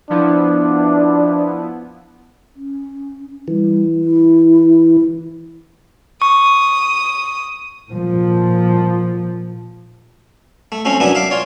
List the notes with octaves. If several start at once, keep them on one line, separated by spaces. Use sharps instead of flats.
F3 B3 D4 E4
C#4
E3 G3
E4
C#6 D#6
A#2 F3
A3
F3 A3 C4 C#4
F#2 E3 B3 D4 E4
E5 F5 D6
F4 C#5 D5